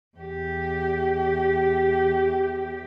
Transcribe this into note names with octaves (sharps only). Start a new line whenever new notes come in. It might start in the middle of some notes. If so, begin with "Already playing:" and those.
E2 G4